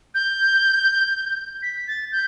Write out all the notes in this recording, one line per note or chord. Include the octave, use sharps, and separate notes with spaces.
G6
B6
A6
G6